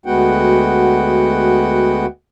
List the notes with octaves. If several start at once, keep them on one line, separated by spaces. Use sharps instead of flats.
D2 G#3 B3 F#4 F#5 G5